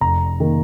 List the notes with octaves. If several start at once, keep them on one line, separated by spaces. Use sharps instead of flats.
F1 A#5
D#3 A#3